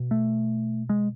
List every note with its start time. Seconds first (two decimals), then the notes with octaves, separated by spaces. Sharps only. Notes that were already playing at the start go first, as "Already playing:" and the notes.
Already playing: B2
0.11 A3
0.89 G#3